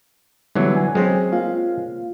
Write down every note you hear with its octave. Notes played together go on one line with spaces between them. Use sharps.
D3 E3 F#3 G3 B3
G#5
F#3 G#3 C4 C#4 G#4
A#3 F4 F5